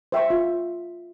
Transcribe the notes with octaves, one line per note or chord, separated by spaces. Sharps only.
C5 E5 G5 C#6
F4